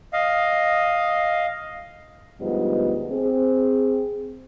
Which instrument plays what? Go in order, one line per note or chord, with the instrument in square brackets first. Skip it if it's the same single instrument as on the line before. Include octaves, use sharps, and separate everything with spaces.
[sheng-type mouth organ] D#5 F5
[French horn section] D2 G#2 F3 G3 B3 D#5
C4 G#4